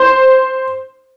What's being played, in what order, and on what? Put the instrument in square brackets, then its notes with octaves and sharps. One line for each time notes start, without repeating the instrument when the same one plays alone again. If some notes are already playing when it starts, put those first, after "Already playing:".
Already playing: [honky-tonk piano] C5